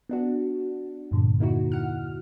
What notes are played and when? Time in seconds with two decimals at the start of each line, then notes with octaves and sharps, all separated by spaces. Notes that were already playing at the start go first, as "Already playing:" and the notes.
0.09 B3 D4 F#4
1.11 E2 G2 A#2 D3
1.40 A#3 D#4 E4 F#4
1.72 F#5 F6